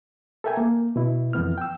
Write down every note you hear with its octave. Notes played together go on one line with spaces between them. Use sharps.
A4 A#4 E5 G5 G#5
A#3
B2 E4
F2 E3 B3 F6
G5 E6